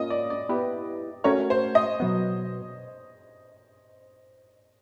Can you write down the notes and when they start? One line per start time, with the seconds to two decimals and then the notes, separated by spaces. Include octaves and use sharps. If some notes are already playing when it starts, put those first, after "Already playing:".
Already playing: A#3 C#4 F4 D#5
0.10 D5
0.30 D5
0.49 B3 E4 G4 B4
1.24 A3 C#4 F#4 A#4 C#5
1.50 C5
1.75 D#5
2.00 B2 F#3 B3